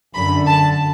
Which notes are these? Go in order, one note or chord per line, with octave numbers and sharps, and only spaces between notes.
F#2 D3 B5
A5